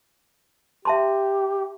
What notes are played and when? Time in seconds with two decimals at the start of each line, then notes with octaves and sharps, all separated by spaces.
0.85 G4 E5 A5 C6